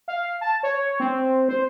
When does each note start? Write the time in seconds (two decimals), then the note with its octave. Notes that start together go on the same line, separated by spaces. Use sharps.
0.08 F5
0.41 A5
0.63 C#5
1.00 C4
1.49 C5